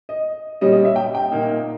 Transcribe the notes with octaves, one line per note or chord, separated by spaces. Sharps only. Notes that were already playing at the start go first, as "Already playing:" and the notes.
D#5
A#2 G3 C#4 D#5
D#5
E5
G5
G5
A#2 A#3 D#4